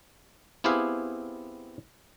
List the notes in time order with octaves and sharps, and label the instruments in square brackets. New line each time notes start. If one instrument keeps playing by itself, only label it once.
[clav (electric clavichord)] B3 C4 E4 G4 G#4 F5